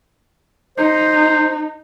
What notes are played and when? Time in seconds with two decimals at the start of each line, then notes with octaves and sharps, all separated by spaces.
0.78 D#4 C5